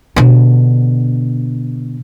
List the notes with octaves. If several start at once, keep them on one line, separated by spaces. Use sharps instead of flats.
B2 D3